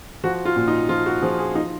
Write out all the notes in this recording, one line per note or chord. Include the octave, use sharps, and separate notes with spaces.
F3 F#4
F4
A#2
D#4
F3 F4
F#4
F3 G#4
G#4
F3 D#4